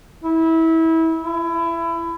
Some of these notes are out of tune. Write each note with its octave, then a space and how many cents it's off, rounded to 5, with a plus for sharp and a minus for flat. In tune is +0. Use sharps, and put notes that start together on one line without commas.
E4 -25
E4 +25